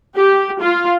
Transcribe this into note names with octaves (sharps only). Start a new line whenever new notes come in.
G4
F4